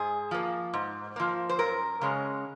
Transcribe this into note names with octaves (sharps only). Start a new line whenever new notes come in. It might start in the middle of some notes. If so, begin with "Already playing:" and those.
Already playing: G#2 G#4
F3 A#3
G#2
F3 A#3
C5
F#2 A#4
C#3 G#3 C#4